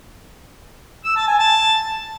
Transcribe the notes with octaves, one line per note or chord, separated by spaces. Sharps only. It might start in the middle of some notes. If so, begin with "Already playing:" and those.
E6
A5
G#5
A5